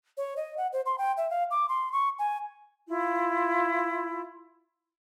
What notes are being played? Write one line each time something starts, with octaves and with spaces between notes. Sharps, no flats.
C#5
D#5
F#5
C5
C6
G5
E5
F5
D6
C6
C#6
G#5
E4 F4